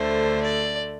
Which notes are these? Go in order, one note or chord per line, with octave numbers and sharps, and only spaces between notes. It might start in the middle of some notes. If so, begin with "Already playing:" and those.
Already playing: D2 D3 A3 C5
D5